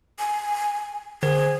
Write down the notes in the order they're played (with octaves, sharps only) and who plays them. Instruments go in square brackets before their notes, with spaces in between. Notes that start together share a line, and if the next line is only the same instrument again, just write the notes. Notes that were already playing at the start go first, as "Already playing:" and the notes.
[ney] G#5
[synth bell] D3 C5 [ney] G#4